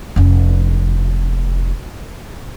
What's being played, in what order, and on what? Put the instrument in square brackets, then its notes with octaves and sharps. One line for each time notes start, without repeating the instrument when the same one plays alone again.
[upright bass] F1 C#4